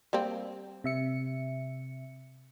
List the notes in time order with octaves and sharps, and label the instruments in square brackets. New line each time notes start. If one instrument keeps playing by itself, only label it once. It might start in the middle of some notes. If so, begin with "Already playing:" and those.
[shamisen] G3 A#3 C4
[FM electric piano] C3 E5 C#7